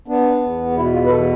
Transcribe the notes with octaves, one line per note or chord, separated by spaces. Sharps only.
B3 D4
E2
B2 E4
F4
B4
E2 A4